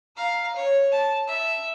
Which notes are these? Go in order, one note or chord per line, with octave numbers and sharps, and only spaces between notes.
F5 A#5
C#5
A5
E5